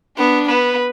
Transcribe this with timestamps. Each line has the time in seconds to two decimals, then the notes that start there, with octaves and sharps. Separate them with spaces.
0.17 B3 D4
0.48 B3 B4